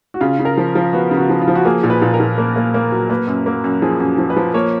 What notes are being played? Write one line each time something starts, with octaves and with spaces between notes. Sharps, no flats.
F#4
C#3 F4
C#3
A#4
F3
F3
B3 F#4
C#3
F#4
F3
F4
F3
F#4
A#3 G#4
A#2
B4
A#2
A#4
A#2
A#3
A#3
A#3
F#3
A#3 B4
F#2
A#3
F#2
F3 G#4
F#2
F3
B4
F3
A#3 C#5